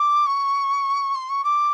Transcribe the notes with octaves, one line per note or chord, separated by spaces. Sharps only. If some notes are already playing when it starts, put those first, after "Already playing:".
Already playing: D6
C#6
C6
C#6
D6